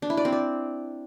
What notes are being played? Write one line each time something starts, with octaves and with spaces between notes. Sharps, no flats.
D4
E4
D5
C4
D5